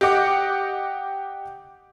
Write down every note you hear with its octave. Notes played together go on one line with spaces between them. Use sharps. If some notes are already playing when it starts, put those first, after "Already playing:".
G4 D#5 F#5 D6